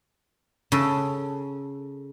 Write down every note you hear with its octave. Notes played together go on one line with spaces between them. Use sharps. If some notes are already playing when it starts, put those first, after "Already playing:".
C#3 A4